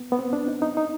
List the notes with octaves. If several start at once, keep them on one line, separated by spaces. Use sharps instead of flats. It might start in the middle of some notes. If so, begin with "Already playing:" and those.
Already playing: B3
B3
C4
D4
D#4
D#4
D#4